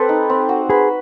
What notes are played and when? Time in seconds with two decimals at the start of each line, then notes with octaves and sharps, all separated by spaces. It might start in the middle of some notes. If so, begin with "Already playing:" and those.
Already playing: C4 G4 A4 B4
0.09 D#4
0.30 C4
0.49 F#4
0.69 G#4 B4